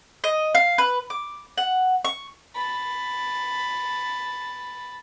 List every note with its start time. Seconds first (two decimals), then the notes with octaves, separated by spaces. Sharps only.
0.24 D#5
0.55 F5
0.78 B4
1.10 D6
1.58 F#5
2.05 C#6
2.56 A5 B5